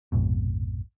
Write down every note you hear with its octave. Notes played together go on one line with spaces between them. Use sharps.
A#1 F2 G#2 B2